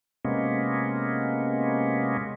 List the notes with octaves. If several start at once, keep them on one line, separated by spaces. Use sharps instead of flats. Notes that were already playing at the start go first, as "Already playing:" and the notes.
C3 G#3 A#3 B3 C#4